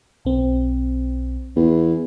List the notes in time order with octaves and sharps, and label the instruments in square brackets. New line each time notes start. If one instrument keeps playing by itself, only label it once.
[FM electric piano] B1 C4
[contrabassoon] E2